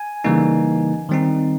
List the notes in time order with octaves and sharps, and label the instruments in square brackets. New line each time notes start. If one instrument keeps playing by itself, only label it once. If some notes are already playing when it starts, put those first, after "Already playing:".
Already playing: [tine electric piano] G#5
C#3 E3 G3 A#3 D#4
D#3 G3 C4 D#4